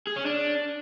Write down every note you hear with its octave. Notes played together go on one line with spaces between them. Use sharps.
G#4
C#4
D4